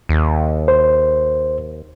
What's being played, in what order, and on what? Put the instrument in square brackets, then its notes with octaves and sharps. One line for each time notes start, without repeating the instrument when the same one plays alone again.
[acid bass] D#2
[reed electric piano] C5